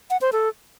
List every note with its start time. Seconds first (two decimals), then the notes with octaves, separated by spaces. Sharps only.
0.10 F#5
0.21 C5
0.32 A4